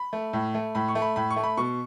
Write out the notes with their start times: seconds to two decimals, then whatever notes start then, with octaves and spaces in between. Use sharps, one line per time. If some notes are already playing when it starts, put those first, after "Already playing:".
Already playing: B5
0.13 A3
0.33 A2
0.55 A3
0.75 A2 B5
0.88 C#6
0.95 A3
1.02 B5
1.16 A2 B5
1.30 C#6
1.36 A3
1.43 B5
1.57 B2 C#6